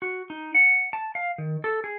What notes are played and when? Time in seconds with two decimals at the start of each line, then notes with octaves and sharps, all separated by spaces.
0.02 F#4
0.30 D#4
0.55 F#5
0.93 A5
1.15 F5
1.38 D#3
1.64 A4
1.84 G#4